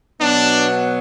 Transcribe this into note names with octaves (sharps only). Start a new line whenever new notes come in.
B2 F#3 B3 D4